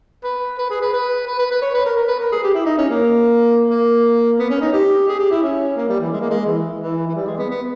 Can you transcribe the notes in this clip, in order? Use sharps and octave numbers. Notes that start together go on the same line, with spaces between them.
B4
B4
G#4
B4
B4
B4
B4
B4
C#5
B4
A#4
A#4
B4
A#4
G#4
G4
E4
D#4
C#4
A#3
A#3
B3
C#4
D#4
G4
G#4
G4
E4
C#4
A#3
G3
E3
G#3
A#3
G#3
E3
E3
E3
G3
G#3
B3
B3